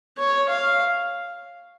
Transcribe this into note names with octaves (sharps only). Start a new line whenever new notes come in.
C#5
F5